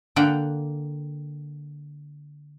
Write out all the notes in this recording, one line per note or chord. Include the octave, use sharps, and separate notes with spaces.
D3 A#3 F#5 G5